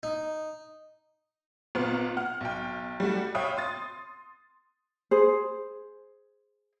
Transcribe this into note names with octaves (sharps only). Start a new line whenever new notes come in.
D#4
G#1 A#2 B3 F6
F#5 F6
B1 G5
G3 A3 F#4
C#5 E5 F5 G5 B5 D#6
C6 D#6 A6
G#4 C5